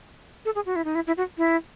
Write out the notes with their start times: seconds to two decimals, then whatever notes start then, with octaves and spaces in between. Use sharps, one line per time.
0.45 A4
0.55 G#4
0.66 F#4
0.76 E4
0.84 D#4
0.95 E4
1.07 E4
1.17 F#4
1.38 E4